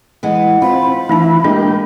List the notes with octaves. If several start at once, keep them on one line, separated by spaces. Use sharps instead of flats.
E3 G#3 B3
C4 F4 B5
E3 A3 D#4 E4 A5
G#3 A#3 D4 G4